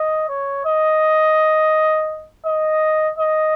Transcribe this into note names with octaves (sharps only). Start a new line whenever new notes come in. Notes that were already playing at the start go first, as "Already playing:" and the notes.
Already playing: D#5
C#5
D#5
D#5
D#5